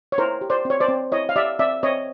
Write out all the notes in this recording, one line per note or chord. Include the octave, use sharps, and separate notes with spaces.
C#5
E4 A#4 C5
G4
C5 D5
C4
C#5
C5 D5
C4
E4 C#5 D#5
F5
G4 D5 E5
C4 D5 E5
C4 C#5 D#5